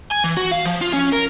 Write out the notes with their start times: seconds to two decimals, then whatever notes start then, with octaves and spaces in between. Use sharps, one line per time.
0.12 G#5
0.24 E3
0.37 F#4
0.51 F5
0.65 F3
0.82 F4
0.93 C#4
1.13 A#4